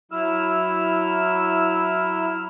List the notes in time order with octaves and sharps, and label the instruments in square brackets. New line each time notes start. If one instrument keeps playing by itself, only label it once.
[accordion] F#3 E4 E6 F6